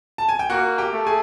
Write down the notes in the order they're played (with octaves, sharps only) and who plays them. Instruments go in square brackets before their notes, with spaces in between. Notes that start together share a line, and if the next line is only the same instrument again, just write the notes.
[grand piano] A5
G#5
G5
[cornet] A#3 [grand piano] F#4 F#5
[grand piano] G4 G5
[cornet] A3
[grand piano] G#4 G#5